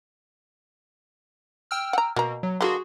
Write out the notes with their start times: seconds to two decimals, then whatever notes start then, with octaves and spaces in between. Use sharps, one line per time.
1.71 G5 E6 F6
1.93 F#5 A#5
2.16 B2 A#3 A#5
2.43 F#3
2.61 D3 A#3 F#4 G#4 C6